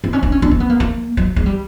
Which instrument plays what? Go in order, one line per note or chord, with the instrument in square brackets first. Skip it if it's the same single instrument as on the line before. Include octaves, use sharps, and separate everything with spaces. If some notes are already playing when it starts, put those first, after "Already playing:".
[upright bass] C4
C#4
D4
C#4
D4
C4
B3
A#3
A#3
F#3
G#3
G3